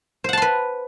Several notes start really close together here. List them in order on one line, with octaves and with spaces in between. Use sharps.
C5 F#5 A5 C6 B4